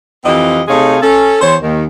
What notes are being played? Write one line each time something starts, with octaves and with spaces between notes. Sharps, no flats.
F2 E3 C4 G4 D#5 F5
C3 A3 D#4 G#4 C#5 F5
C#4 A4
E2 C5 C#5
D#2 D#3